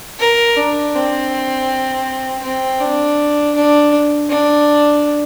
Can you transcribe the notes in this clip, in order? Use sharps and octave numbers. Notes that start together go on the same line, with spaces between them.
A#4
D4
C4
C4
D4
D4
D4